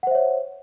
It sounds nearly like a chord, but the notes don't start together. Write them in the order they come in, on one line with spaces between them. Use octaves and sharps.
F#5 C5 E5 C#5